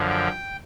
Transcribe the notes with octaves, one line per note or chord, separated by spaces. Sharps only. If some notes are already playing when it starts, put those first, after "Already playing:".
Already playing: F#2 D3 F3
G5